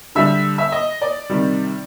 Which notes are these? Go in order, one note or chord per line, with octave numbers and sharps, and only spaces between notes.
D3 G3 E5
E5
D#5
D5
C3 D#3 G3